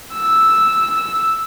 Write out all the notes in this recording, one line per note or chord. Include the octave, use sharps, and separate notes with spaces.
E6